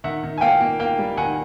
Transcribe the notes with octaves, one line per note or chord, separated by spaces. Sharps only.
D#3 E5 F#5
D#3
G#5
A#3 F5 G5
A#3
A#3 F5 G5
G3
D#3 F#5 G#5